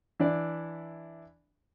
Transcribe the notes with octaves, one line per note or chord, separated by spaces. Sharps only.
E3 D4 E4 D5